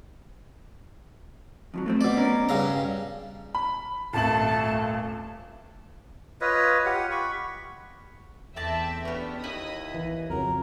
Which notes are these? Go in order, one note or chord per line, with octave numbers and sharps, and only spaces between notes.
F2 F3 F#3
A3 A#3 C4
B2 D5
C#4 A#4
G2 C#3 A#5
B5
D#1 G#1 A3 A5 F#7
F4 B4 C#5 D#5
F4 G4 F#5
B5 C#6
E2 A3 C4 D5 E5 G5 A5
B3 C#4 D4 G4
D#2 E4 D#5 D#6
B1 E3
F2 C#3 F#3 A#4